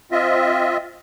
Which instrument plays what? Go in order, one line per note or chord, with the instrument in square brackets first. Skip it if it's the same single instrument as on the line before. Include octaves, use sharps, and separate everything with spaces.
[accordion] C4 F4 D#5 E5